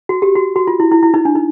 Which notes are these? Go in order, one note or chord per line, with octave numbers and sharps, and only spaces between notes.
F#4
G4
F#4
F#4
F4
E4
E4
E4
D#4
D4
D#4